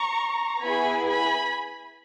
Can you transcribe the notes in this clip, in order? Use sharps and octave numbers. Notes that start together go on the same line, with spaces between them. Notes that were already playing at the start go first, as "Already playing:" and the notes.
Already playing: A#5 C#6
B3 E4 G#4 G#5 B5
G#5 B5